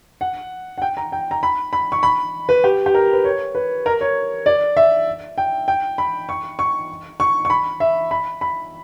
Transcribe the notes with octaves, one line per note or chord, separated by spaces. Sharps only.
F#5
F#5
G5
A#5
G5
A#5
B5
B5
C#6
B5
B4
G4
G4
A#4
B4
C#5
B4
A#4
C#5
D5
E5
G5
G5
B5
C#6
C#6
C#6
C#6
B5
E5
B5
B5